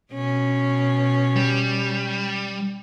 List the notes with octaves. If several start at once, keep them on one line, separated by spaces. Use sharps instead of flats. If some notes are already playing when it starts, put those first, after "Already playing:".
B2 C#4
G3